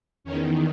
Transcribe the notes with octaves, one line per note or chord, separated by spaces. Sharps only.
E2 D#3 C#4